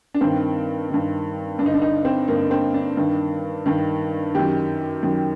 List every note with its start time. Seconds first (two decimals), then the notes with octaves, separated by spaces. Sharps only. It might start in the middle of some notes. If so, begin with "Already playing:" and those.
0.14 D4
0.21 G2 D#3 C4
0.90 G2 D#3
1.59 G2 D4
1.63 D3 D#4
1.74 D4
1.82 D#4
2.05 C4
2.28 G2 D3 A#3
2.51 C4
2.74 D4
2.97 G2 D#3
3.66 G2 D#3
4.35 F#2 D#3 G4
5.03 F#2 D#3